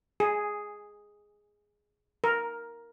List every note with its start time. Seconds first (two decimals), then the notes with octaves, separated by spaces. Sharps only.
0.20 G#4
2.24 A#4